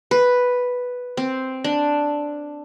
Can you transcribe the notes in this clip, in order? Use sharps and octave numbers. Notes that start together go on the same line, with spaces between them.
B4
C4
D4